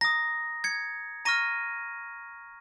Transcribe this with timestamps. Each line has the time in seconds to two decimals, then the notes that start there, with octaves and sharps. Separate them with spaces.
0.01 A#5 D#6 A#6
0.64 G#6 C#7
1.25 A#5 C#6 F6 A#6 D#7